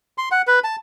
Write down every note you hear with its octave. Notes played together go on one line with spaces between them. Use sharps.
C6
F#5
B4
A5